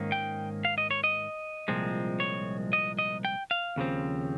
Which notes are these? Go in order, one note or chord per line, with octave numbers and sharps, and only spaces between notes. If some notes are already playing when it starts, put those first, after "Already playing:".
Already playing: G#2 D#3 A#3 C#4
G5
F5
D#5
C#5
D#5
C2 A#2 F3 G#3 C4
C#5
D#5
D#5
G5
F5
D#2 C#3 F3 C4